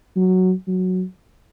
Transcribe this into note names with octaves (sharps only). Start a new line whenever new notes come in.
F#3
F#3